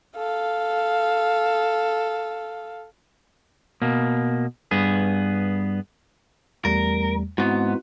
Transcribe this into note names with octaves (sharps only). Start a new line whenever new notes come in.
A4 F5
B2 A#3
G2 B3 G#4
E2 G3 A3 A#4
G#2 B3 C4 E4 F#4